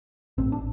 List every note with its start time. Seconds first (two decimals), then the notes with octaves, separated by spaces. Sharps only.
0.38 A1 A2 C4
0.52 D4